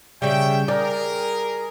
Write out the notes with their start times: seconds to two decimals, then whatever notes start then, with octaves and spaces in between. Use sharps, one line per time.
0.22 C#3 G3 C#5 E5 G5
0.68 G#4 A#4 D5